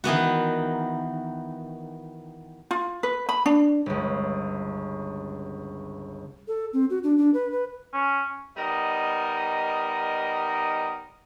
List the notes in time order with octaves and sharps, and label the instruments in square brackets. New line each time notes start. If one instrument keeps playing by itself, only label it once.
[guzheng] D#3 E3 B3 F#4
[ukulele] F4
B4
B5
D4
[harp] G1 C#2
[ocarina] A4
C4
F#4
D4
D4
B4
B4
[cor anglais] C#4
[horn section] G3 B3 D#4 A#4 D#5